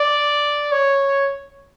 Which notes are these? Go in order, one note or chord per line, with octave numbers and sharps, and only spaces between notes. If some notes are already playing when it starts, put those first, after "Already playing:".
Already playing: D5
C#5